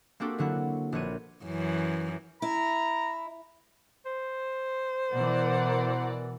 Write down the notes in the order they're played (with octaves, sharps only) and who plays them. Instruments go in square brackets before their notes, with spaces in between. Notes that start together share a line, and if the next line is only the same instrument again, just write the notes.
[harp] A#3 C4 D4 F#4 G4 A4
D3 F#3 E4 F#5
A#1 B4 C#5 D#7
[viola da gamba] F#2 E3
[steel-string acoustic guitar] E4 [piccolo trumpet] A#5
[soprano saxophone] C5
[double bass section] B2 E3 [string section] A#4 D5 F#5